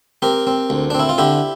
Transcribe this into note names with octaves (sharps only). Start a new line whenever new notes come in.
C4 G4 A#4
C4
D2
C4 D4
E4
F4
D3 E4 G4